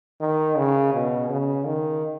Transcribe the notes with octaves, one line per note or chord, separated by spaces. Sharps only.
D#3
C#3
B2
C#3
D#3